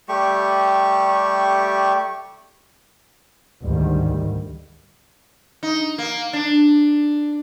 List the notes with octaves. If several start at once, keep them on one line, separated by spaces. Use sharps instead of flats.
G3 A3 G4 C#6
D2 G#2 D#3 G3
D#4
A#3
D4